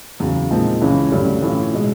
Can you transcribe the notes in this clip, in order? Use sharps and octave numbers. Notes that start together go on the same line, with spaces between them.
E2 C#3 F#3
A#2 F3 G#3 C4 D#4
C#2 C#3 E3 G#3 C#4
G2 D3 F#3 A3 C#4
A2 E3 A3 C#4 F4
B2 G#3